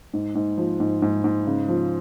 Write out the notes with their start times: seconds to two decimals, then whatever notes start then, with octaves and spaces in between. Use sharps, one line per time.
0.14 G#2
0.35 G#2
0.58 F3
0.80 G#2
1.02 G#2
1.24 G#2
1.47 C#3
1.68 F3